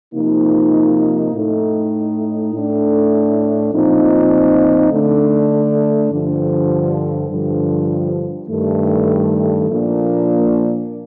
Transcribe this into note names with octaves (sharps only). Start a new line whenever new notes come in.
C3 F3 A#3 D#4
A2 A3 D#4
A2 A3 D4
A#2 F3 C4 D#4
D3 A3 D4
G2 D3 F3
G2 D3 F3
G2 D#3 A3
A#2 F3 A#3 D4